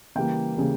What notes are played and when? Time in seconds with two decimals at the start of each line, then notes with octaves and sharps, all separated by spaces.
0.15 C#3 E3 G3 A#3 G5
0.54 C#3 E3 G3 A#3